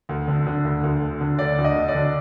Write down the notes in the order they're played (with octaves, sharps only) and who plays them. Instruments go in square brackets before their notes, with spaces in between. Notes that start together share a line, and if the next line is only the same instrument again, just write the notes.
[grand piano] D2
D3
D3
D2
D2
D3
D3
D2 D5
D2
D#5
D3
D5
D3